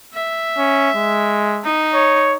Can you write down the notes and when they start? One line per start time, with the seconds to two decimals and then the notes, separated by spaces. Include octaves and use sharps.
0.14 E5
0.58 C#4
0.95 G#3
1.64 D#4
1.94 C#5